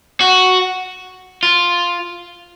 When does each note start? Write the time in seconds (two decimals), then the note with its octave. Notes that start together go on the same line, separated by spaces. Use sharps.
0.21 F#4
1.43 F4